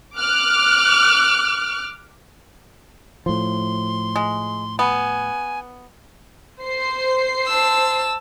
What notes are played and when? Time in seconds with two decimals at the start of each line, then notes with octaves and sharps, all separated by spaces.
0.19 D6 F6 F#6
3.26 A2 F3 C6
4.16 G#3
4.79 B3 G#5
6.62 C5 C7
7.47 A5 E6